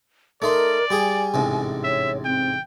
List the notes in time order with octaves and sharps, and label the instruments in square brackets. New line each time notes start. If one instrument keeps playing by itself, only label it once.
[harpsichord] A3 D#4 C6 [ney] A#4 [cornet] D5
[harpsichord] G3 G4 G#4 [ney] G#5
[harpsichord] A1 G#2 C3
[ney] C#5 [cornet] E5
[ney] C4 [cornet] G5